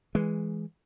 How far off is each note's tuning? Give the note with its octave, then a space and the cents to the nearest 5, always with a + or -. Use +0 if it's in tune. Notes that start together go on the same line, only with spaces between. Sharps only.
E3 +0 G#3 +0